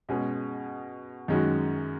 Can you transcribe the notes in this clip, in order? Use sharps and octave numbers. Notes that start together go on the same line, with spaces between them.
B2 G#3 C#4 G#4
F#2 D#3 G#3 C#4 F#4